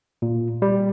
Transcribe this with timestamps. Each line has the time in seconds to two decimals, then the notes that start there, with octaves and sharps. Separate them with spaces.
0.22 A#2
0.62 G3